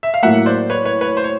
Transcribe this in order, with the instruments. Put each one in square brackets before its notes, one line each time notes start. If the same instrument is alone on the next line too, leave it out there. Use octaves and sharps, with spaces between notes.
[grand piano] E5
F5
[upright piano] A2 F#3 A#3 [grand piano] E5 F#5
[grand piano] C5 D5
B4 C#5
B4 C#5
B4 C#5
C5
C#5